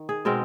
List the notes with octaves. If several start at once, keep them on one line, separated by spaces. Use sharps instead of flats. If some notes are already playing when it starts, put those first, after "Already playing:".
Already playing: D#3
G#4
B2 G#3 C4 A#4